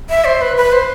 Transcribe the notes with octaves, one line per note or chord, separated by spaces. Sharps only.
E5
C5
B4
B4
C5